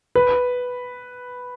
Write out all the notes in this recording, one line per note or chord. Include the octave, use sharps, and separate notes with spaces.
B4